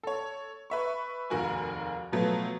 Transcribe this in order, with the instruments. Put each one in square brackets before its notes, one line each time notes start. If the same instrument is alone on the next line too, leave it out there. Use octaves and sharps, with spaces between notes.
[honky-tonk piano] A4 C#5
B4 E5 C#6
F1 D#2 G#2 F#4 A#4 G#5
B2 F3 F#3 A3 B3